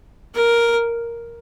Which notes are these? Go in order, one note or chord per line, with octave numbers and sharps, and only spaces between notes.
A#4